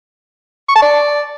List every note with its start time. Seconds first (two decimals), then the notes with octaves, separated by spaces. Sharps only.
0.69 C#6
0.76 A5
0.82 D5